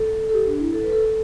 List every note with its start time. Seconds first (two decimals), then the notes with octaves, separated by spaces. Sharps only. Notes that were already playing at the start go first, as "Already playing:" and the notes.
Already playing: A4
0.29 A4
0.33 G4
0.47 D4
0.60 E4
0.73 A4
0.83 B4
0.92 A4